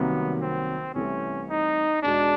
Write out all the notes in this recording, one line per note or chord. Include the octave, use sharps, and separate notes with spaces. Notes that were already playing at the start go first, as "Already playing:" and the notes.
Already playing: C2 C3 D#3 F#3 A#3 B3
C4
C2 C3 E3 A3 C#4
D#4
E2 B2 G#3 D4